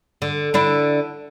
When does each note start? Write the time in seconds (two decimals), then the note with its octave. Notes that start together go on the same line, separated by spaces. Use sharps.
0.22 D3
0.54 D3 D4 E4